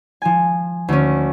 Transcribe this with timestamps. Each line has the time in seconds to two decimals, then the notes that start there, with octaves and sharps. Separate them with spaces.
0.22 F3 G#5
0.88 D2 C#4